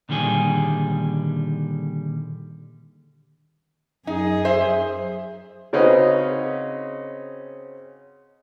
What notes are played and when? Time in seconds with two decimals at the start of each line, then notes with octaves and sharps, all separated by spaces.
0.09 A#2 D3 D#3 G3 G#4
4.07 F#2 D#4 G#4
4.45 C5 E5
5.73 C#3 C4 C#4 D#4 F#4 B4